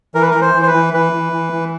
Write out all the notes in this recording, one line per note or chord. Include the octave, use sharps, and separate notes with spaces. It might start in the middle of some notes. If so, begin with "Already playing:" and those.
E3 A#4
B4
E3 A#4
C5
E3
C5
B4
E3
E3 B4
E3
E3
E3